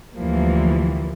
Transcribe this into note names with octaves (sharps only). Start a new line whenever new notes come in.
D2 E3 F3 G3 A#3